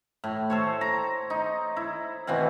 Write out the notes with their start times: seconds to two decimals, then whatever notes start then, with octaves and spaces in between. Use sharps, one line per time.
0.24 A2
0.50 A4 C5 C#5
0.81 A#5
1.30 D#4
1.76 E4
2.27 B2 E3 C4 F#5